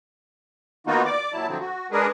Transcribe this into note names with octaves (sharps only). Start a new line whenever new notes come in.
D#3 A#3 B3 D#4 F4 F#4
D5 D6
A#2 F#3 E4 A5
D3 F3 F#3 C4
F#4
G#3 D4 G#4 A#4 B4